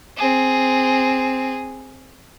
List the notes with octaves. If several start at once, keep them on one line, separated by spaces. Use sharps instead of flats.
C4 G#4